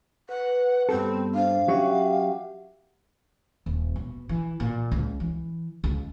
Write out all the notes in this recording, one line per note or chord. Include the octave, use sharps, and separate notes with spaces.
B4 F#5
G2 G3 B3 C4 A4
D4 C5 F5
F#3 C#4 F#4 G4 E5 F#5
D#1
B2
E3
A#2
C#2
E3
C#2